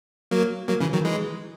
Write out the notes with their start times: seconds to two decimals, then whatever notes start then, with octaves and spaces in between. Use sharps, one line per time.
0.31 F#3 A#3
0.68 F#3 A#3
0.81 C#3 E3
0.93 D#3 F#3
1.05 E3 G#3